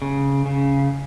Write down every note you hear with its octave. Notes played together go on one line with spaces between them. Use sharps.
C#3
C#3